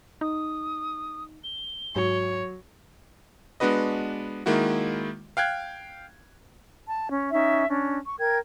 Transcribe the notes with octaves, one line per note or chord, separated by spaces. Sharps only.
D#4 D#6
G7
G#2 F#3 C#5
G#3 B3 D4 F#4 B4 D#5
D#3 G#3 A#3 E4 F#4
F5 G5 F#6 G#6
A5
C#4
C#4 D#4 E5
C#4 D4
C#6
A#4 G5 G#6